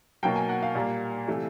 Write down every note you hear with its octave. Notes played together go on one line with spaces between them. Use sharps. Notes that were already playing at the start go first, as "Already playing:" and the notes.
B2 F#3 A#3 G5
G#5
F#5
F5
A#2 G3 A#3
C3 E3 A3